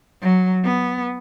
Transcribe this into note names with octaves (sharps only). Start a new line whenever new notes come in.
F#3
B3